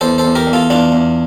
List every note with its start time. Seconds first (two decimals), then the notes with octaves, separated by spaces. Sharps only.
0.01 E2 A4 C5
0.18 A4 C5
0.25 E2
0.35 G4 A#4
0.47 E2
0.53 F4 A4
0.70 E2 D4 F4
0.92 E2